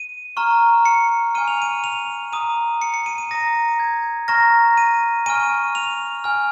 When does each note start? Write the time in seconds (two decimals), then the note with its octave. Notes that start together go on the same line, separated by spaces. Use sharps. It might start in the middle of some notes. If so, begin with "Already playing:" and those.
Already playing: D#7
0.37 A#5 C#6 F6
0.85 C#7
1.35 G#5 C#6 F6 D#7
1.48 F7
1.62 D#7
1.84 F7
2.32 A#5 D#6 D#7
2.82 C#7
2.94 C#7
3.06 D#7
3.18 D#7
3.31 A#5 D#6 A#6
3.80 G#6
4.28 A#5 C#6 F6 A#6
4.77 D#7
5.26 G#5 C#6 F6 D#7
5.75 F7
6.24 G#5 F6